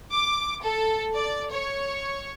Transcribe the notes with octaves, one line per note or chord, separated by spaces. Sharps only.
D6
A4
D5
C#5